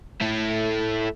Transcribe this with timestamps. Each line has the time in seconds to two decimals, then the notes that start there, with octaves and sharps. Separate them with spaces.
0.22 A3 E4